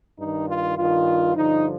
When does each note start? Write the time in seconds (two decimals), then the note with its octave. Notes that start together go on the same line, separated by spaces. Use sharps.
0.19 G2 D#3 D#4
0.49 F4
0.78 G2 D#3 F4
1.36 G2 D3 F3 D#4